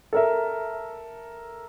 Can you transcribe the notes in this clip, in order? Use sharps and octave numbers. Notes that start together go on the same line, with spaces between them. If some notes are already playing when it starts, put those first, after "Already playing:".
A4 A#4 E5